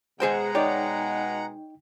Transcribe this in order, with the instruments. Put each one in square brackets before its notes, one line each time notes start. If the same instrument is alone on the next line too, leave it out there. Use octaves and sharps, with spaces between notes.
[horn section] B2 G#3 [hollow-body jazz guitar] G#4 C5 G5 [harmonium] F#5 A#5
[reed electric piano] D#4 G5 [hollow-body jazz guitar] C#5 D5